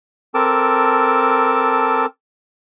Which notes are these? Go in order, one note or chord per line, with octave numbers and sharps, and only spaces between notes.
C4 A4 A#4 A5 D6